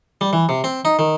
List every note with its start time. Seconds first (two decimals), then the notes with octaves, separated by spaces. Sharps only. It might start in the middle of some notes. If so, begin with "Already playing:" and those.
0.21 G3
0.33 E3
0.49 C3
0.64 C4
0.85 D#4
0.99 D#3